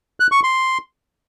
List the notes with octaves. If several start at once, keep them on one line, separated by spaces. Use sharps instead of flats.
F#6
C#6
C6